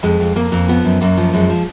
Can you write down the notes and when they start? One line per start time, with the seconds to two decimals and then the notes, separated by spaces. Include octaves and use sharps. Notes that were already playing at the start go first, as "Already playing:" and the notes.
0.03 F2 G#3
0.20 F2
0.35 F2 A#3
0.52 F2
0.68 F3 B3
0.85 F#2
1.01 F#2 A#3
1.17 F3
1.33 F#2 G#3
1.49 F3